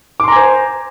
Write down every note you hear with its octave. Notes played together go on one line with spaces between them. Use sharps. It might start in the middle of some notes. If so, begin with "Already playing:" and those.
C5 G#5 A#5 C6 D6